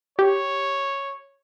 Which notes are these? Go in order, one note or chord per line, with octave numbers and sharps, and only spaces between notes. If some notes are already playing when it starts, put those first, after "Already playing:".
G4 C#5